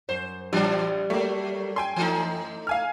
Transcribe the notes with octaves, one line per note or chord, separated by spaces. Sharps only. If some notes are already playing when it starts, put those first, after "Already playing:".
F#2 C5
A#1 E3 F#3 G3 D4
F#3 A3 A#3
F#2 G5 G#5 C6
E3 A3 D#4
F5 G#5 F6